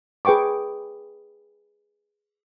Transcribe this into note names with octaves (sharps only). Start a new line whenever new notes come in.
G#4 B4 G5 C#6 D6